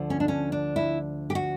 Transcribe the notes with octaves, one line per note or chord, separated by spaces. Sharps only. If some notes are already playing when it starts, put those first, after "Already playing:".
Already playing: D2 D3 F3
C#4
D4
C#4
D4
E4
G4
F#4